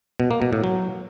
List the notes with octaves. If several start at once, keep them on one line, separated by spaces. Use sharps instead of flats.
B2
A#3
B2
A2
F#3